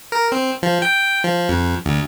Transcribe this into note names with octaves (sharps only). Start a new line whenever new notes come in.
A#4
C4
F3
G5
F3
F2
D2